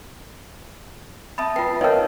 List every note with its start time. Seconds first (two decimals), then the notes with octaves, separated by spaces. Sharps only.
1.38 E5 A5 B5 D#6 A6
1.56 F4 B4 G5 C7
1.81 D#4 A#4 C#5 D#5 F5 G5 A5